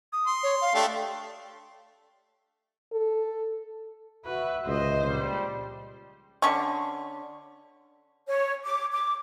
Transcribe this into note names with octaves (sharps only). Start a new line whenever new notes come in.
D#6
C6
C#5
F5
A3 D4 G4
A4
F#4 B4 E5
C#2 C5 D#5
A#1 G3
D3 C#4 C#6
C#5
D6
D6